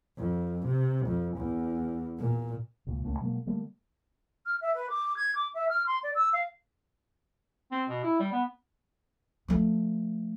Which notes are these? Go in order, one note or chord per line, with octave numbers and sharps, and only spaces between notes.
F2
C3
F2
E2
A#2
E1 C#2 A#2
C#2 A3 A#3 C#4
B2 F#3 G#3 A#3
D3 G3 A3 A#3
F6
E5
B4
D6
G#6
D6
E5
F6
C6
D5
E6
F5
C4
B2
E4
G3
B3
F3 A3